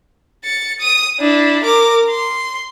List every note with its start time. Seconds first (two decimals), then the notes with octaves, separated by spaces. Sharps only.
0.44 A6 C#7
0.81 D#6 D#7
1.20 D4 E4
1.64 A#4 D6
2.10 C6